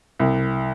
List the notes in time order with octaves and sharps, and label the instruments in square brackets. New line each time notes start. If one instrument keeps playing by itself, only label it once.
[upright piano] C2